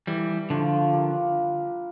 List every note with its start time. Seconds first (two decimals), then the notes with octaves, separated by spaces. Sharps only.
0.07 E3 G3 E4 A4 E5
0.50 D3 F3 A3 D4 F4
0.93 G3 D4 F4 A#4